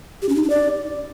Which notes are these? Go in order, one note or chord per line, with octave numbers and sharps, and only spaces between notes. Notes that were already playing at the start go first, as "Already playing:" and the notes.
G4
C#4
D#4
D4
D5